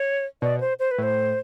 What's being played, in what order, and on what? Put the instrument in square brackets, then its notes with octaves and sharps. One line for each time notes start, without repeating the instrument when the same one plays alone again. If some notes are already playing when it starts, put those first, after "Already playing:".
Already playing: [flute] C#5
[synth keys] B2 [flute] D5
[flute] C5
C5
B4
[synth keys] A2 [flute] C5